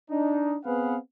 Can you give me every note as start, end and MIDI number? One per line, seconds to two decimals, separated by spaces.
0.11 0.56 62
0.11 0.56 63
0.65 0.97 59
0.65 0.97 60
0.65 0.97 68
0.65 0.97 71
0.65 0.97 77
0.65 0.97 78